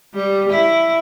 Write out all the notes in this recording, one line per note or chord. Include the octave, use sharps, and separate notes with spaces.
G3
E4